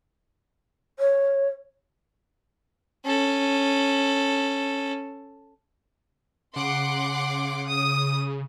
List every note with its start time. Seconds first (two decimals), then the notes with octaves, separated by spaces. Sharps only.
0.99 C#5
3.05 C#4 A4
6.56 C#3 F#5 C6 D6
7.68 D#6